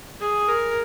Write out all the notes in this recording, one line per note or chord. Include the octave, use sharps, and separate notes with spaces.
G#4
A#4